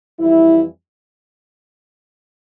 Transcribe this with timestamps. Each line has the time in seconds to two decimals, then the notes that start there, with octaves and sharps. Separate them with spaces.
0.19 F2 E3 G3 E4